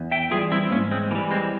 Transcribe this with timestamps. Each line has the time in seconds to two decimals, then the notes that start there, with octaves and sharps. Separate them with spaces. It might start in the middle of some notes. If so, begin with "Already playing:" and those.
Already playing: E2
0.11 E5 G5
0.31 E3 G3 F4 G#4
0.52 C4 E4
0.71 G#2 A#3 C#4
0.91 G#3 C4
1.11 E3 A#3
1.15 G3
1.31 G#3 C4